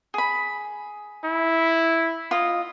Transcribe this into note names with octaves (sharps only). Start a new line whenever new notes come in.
G#4 B5
E4
F4 D#5